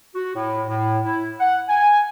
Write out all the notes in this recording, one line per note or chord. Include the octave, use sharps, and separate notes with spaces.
F#4
A2
A2
E4
F#5
G#5